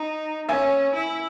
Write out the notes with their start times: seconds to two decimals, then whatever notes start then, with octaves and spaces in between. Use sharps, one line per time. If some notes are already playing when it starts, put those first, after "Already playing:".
Already playing: D#4
0.49 C#4 E5 G#5
0.95 E4